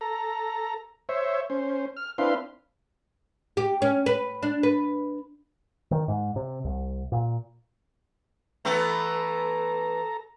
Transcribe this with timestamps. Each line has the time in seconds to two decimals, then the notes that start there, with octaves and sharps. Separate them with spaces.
0.01 A4 A#5
1.09 C5 C#5 E5
1.50 C#4 C5
1.97 F6
2.18 C4 D4 E4 B4 F5 C6
3.57 G4
3.82 C#4
4.06 B4
4.43 D4
4.63 B4
5.91 D#3
6.08 G#2
6.36 C3
6.65 C2
7.12 A#2
8.65 E3 A3 B3 A4 A#5